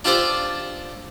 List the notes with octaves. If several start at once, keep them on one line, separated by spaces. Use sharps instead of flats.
D4 F4 G4 A4 C5 D5